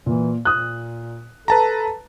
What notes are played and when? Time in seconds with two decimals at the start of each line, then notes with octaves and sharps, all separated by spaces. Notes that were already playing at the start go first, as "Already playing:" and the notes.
0.06 A#2 E3
0.45 A#2 D#6 F#6
1.48 A4 B4 A5 A#5